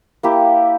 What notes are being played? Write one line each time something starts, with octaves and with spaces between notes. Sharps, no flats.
A#3 E4 G4